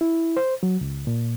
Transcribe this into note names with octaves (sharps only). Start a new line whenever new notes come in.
E4
C5
F#3
C#2
A#2